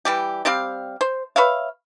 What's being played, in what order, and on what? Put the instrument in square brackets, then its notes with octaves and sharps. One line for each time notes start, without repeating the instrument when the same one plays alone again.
[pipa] E3 G3 G4
G3 C4 G4 F5
C5
B4 C#5 E5 F5